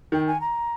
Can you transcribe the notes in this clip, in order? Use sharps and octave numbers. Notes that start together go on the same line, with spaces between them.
D#3 G5
G#5
A#5